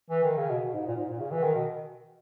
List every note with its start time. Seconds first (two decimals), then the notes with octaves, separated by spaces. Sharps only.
0.10 E3
0.24 D#3
0.37 C#3
0.50 B2
0.74 G#2
0.87 A#2
0.97 G#2
1.08 A#2
1.20 C#3
1.32 E3
1.43 D#3
1.55 B2